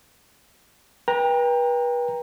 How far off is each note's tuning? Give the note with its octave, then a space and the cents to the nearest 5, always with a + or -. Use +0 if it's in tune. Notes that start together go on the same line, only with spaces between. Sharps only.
B4 -35 G5 +25 A#5 +0